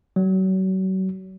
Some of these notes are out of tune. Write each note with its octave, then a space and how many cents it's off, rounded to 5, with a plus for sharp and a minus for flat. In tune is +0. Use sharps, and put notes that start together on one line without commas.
F#3 +35